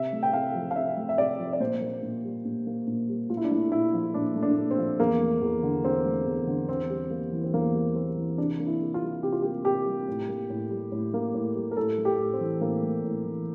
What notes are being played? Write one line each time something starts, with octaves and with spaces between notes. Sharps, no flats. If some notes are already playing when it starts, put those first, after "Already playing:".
Already playing: C3 E5
A3
G5
C3 F5
F3
F5
C3 E5
A3
E5
C3 D5
F3
D5
A#2 C5
A#3
A#2
G3
A#2
A#3
A#2
G3
A#2 F4
E4
D4
A3 E4
A#2 E4
F3
A#2 D4
A3
D4
A#2
C4
F3
E2 A#3
A3
E2
D3
E2 C4
A3
E2
D3
E2 C4
G3
A#3
E3
C4
E2 A#3
G3
A#3 C4
E3
C3 D4
A#3
E4
C3
F4
G3
C3 G4
F4
A#3 G4
C3 G4
G3
A2
A#3
A2
G3
A2
A#3
A2
G3
A#4
A2 A4
A3
G4
A2
C4
E3
A2 A#3
A3
A2
E3